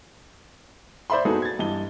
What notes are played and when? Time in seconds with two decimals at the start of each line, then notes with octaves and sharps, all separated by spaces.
1.10 C5 D5 E5 B5 C6
1.25 G#3 B3 D#4 F#4 G#4 A4
1.42 G#6 A6
1.59 G2 E3 D#5 A5 G7